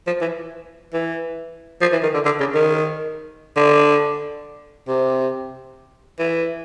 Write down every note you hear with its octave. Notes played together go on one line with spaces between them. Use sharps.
F3
E3
E3
F3
E3
D#3
D3
D3
C#3
D#3
D3
C3
E3